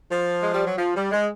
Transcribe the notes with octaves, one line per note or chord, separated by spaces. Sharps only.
F3
G#3
G3
F#3
F3
G3
G#3